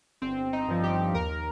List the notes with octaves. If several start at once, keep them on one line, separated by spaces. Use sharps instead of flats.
G1 C4
D#4
G2 F3
G4
D#2 A#4